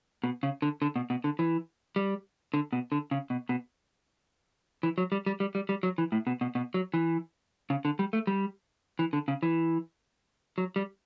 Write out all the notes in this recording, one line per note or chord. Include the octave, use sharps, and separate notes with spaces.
B2
C#3
D3
D3
B2
B2
D3
E3
G3
D3
B2
D3
C#3
B2
B2
E3
F#3
G3
G3
G3
G3
G3
F#3
E3
A2
B2
B2
B2
F#3
E3
C#3
D3
G3
A3
G3
E3
D3
C#3
E3
F#3
G3